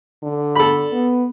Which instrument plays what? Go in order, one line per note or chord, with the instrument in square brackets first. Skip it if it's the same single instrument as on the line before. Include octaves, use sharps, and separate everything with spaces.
[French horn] D3
[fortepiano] A4 B5
[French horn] B3